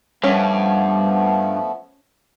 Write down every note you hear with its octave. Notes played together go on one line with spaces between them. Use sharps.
G2 F3 A3 B3 C#4